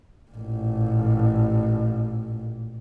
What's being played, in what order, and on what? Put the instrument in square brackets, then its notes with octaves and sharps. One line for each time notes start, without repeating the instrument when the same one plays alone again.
[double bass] A1 A#2